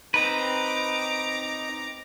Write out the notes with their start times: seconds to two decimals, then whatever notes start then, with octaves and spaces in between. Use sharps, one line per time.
0.14 C4 D#4 B4 A#5 D6